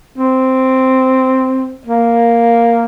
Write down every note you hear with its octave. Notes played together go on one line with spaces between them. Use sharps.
C4
A#3